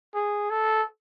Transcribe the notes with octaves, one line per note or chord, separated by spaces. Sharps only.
G#4
A4